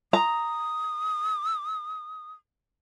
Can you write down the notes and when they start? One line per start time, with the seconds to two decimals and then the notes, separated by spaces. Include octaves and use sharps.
0.13 A#5 D#6